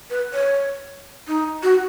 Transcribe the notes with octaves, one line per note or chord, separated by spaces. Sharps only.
B4
C#5
D#4
F#4